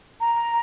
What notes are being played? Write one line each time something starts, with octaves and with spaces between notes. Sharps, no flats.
A#5